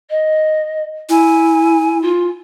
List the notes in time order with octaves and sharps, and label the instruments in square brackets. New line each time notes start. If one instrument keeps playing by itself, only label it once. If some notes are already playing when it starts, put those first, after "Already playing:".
[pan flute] D#5
[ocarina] E4 [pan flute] G#5
[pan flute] F4